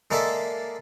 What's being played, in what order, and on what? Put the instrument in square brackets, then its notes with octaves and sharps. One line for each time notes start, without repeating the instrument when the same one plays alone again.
[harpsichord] G#3 A#3 A4 D5 E5